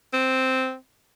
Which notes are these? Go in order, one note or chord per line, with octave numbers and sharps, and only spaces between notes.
C4